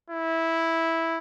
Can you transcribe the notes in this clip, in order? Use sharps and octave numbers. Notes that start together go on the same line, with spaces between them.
E4